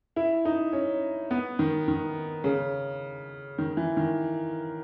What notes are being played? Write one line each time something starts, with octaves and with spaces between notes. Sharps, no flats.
E4
D#4
C#4
B3
D#3
D#3
C#3
D#3
E3
D#3